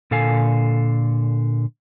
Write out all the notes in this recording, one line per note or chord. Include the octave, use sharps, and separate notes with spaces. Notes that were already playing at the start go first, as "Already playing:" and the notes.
A#2 D3 A4 F5 G#5